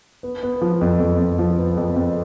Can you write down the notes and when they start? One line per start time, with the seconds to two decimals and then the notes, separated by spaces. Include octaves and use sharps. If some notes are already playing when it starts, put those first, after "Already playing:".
0.23 B3
0.43 B3
0.62 F3
0.81 F2
1.00 F2
1.19 F2
1.39 F3
1.58 B3
1.77 F2
1.96 F2